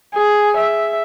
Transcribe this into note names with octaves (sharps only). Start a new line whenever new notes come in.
G#4
E5